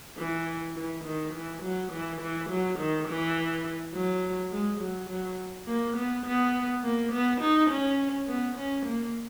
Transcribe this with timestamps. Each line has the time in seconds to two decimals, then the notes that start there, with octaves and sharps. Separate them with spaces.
0.18 E3
0.76 E3
1.04 D#3
1.33 E3
1.62 F#3
1.92 E3
2.21 E3
2.49 F#3
2.79 D#3
3.08 E3
3.94 F#3
4.52 G#3
4.81 F#3
5.09 F#3
5.67 A#3
5.97 B3
6.26 B3
6.84 A#3
7.12 B3
7.41 D#4
7.70 C#4
8.28 B3
8.57 C#4
8.86 A#3